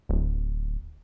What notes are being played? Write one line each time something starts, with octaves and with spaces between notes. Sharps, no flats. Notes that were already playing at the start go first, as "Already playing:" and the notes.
D1